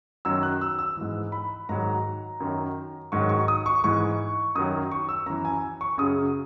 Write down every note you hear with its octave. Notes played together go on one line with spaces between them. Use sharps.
F#2 D#3 F#3 E6
F#6
E6
E6
G#2 E3
B5
G#2 D#3 F#3 A#5
F#2 D#3 F#3
G#2 D#3 F#3 C#6
C#6
D#6
C#6
G#2 E3 C#6
F#2 D#3 F#3 D#6
C#6
E6
F#2 E3 A#5
G#5
C#6
F#2 C#3 F#3 D#6